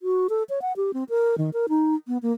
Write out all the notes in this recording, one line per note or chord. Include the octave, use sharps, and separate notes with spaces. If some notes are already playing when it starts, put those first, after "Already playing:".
F#4
A4
C#5
F#5
G4
C4
A#4
D#3
A#4
D#4
B3
A#3